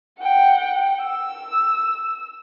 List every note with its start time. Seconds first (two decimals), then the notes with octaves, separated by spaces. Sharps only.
0.20 F#5 G5
1.03 E6